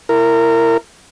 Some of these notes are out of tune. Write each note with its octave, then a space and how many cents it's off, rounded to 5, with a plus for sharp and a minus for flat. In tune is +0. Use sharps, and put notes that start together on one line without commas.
E4 +20 A#4 -20